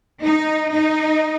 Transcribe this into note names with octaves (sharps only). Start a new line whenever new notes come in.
D#4
D#4